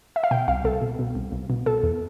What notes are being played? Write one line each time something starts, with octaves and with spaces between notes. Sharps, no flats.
E5
F5
B2 G5
C2 F5
C2 A4
B2
B2
C2
C2
B2
B2 A4
E2